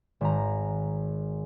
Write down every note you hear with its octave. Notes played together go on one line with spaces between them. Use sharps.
G#1 A#5